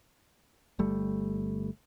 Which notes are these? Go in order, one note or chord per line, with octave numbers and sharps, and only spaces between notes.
G1 G3 A3